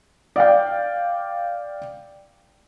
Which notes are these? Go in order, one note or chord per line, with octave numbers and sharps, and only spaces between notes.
D5 F5 G5